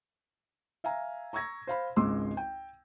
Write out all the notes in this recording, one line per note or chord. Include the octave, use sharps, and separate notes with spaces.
E5 F5 G#5 A#5
A#5 C#6 E6 G#6 A#6
C5 F5 B5
G#1 C#2 G#3 C6 D6 E6
G5